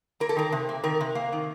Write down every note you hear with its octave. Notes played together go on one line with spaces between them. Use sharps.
A#3 A#4
A4
D#3 A#4
C3
A#3
D#3 A#4
C3
A#3
D#3